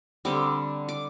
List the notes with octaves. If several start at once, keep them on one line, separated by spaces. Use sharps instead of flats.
D3 G3 C4 D6
D6